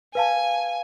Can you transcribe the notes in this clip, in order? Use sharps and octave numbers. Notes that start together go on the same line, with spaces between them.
B4 F5 G#5 A5